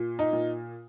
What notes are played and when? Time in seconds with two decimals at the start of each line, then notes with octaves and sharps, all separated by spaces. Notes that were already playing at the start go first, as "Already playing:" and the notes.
Already playing: A#2
0.19 D#4
0.33 A#2